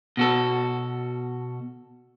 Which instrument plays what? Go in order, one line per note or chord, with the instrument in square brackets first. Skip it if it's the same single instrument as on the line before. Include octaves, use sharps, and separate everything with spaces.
[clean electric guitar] B2 F#4 A4